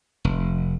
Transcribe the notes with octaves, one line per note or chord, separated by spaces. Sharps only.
F1